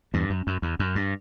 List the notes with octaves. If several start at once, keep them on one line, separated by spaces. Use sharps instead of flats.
E2 G2
F#2
F#2
E2
F#2
G2